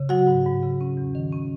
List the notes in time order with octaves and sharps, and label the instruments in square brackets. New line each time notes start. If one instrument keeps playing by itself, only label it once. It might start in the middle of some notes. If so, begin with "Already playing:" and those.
Already playing: [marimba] C#3
F#3 F#4 F#5
G#2
G#2
C#3
C#4
E2
D#3
C#4